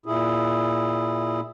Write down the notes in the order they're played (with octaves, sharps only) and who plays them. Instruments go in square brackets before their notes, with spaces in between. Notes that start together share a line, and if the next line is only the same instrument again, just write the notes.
[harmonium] A#2 E4 G#4